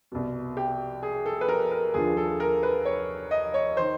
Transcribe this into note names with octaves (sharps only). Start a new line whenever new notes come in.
C2 B2
G4
G#4
A4
B4
A#4
A#4
D#2 D3 F3 G#4
A4
A#4
B4
C#5
D#5
C#5
D#3 C5